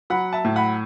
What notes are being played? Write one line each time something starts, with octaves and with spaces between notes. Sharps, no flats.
F#3 F#5 B5
E5 A5
A2
F#5 B5